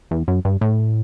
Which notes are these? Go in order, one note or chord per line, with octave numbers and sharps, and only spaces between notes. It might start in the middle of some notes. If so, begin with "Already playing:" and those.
E2
F#2
G2
A2